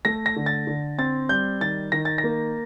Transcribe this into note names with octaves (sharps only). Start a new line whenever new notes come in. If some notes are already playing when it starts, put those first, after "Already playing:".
A3 A#6
A#6
D3
A6
D3
C4 A6
G3 G6
D#3 A6
D#3 A#6
A6
A#6
A#3